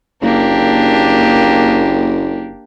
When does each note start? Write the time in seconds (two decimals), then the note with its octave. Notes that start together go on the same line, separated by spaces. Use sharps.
0.22 F#1 A#3 D4 G4